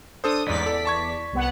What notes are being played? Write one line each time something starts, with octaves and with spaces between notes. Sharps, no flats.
D4 A4 C5 D#6
A1 E2 G#2 D5 B6
A4
A5 C#6 G#6
C2 B3 F#5